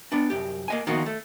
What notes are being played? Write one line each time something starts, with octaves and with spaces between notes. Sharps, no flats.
B3 D4
C2 F#2 G4
A#3 D#5 G#5
D#3 F3 A#3 B3 D#4 F#4
A3